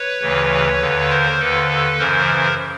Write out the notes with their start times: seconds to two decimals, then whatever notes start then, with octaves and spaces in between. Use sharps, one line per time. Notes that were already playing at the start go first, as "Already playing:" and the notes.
Already playing: B4 C#5
0.21 D2 C#3 E3
0.80 D#2 D3
1.10 A#4 C5
1.39 D#2 D3 A4 B4
1.99 F#2 C#3 E3 A#4 C5